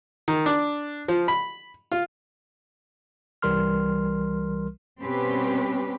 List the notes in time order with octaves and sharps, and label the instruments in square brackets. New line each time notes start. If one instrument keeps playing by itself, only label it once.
[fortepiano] D#3
D4
F3
B5
F4
[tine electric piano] C2 E3 G3 A#4 C6 F6
[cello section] B2 G3 C4 C#4 G4 B4